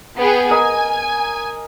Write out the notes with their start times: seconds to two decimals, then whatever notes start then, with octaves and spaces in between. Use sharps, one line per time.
0.17 B3 G#4 G5
0.50 A#4 D#5 G#5